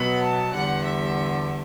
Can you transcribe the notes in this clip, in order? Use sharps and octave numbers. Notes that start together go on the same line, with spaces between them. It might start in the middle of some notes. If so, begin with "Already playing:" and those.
Already playing: B2 F#3 B3 B5
A5
E2 D3 G3 F#5
E5